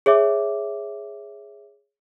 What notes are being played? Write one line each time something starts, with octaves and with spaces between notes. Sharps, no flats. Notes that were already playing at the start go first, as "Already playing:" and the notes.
G#4 C#5 E5 D6